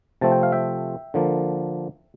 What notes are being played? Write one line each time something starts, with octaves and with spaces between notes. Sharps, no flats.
C3 F3 A3 C4 A5
G5
F5
E5 G5
D3 F3 A#3